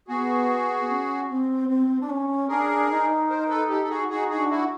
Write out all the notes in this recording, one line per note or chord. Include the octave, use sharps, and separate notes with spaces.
B3 F#4 G#4
C#4
C4
C4
D4
C#4
D4 G#4 A#4
D#4
A#4 C5
A4 B4
G4 A4
A4
F#4 G#4
D#4 F#4 G#4
F#4 G#4
D4
E4 F#4